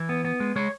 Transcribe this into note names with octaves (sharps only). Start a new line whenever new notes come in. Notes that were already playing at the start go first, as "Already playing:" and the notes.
Already playing: E3
B3
B3
G#3
G#3 C#5